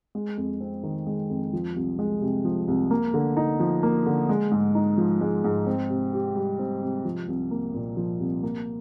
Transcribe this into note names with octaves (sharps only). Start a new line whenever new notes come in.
G#3
F2
C4
D#3
G#3
F2
F3
C2
G#3
C3
F3
C2
A#3
D3
D#4
F3
A#3
D3
G#3
G#2
D#4
F3
G#3
G#2
C4
C3
G4
G3
C4
C3
F3
C2
A#3
A#2
F3
C2
A#3